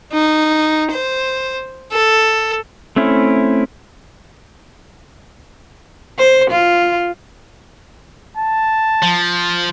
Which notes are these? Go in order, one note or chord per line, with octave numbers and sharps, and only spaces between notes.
D#4
C5
A4
A3 C4 C#4 E4
C5
F4
A5
F3